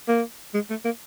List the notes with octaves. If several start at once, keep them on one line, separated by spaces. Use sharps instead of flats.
A#3
G#3
A3
A#3